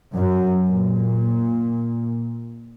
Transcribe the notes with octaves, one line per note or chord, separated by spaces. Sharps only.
F#2
A#2